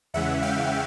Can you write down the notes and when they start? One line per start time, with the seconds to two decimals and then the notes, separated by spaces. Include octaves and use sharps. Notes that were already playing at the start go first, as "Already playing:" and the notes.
0.14 E2 C#3 E3 G#3 C#4 E5 F#5
0.42 F5 G5